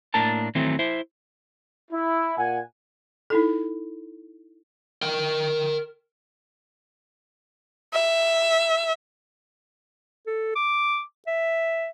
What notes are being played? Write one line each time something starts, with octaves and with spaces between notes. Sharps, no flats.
A2 A#3 D4 A#4 A5
D#3 E3 F#3 A3 C4
E4 C5 E5
E4
A#2 F#5 G#5
D#4 E4 A4
A#4 G5
E5
A4
D6
E5